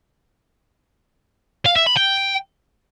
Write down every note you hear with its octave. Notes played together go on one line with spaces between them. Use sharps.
F5
E5
B5
G5